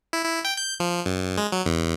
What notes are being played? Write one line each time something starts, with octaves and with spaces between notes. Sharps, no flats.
E4
E4
G5
G6
F3
F#2
G#3
F#3
E2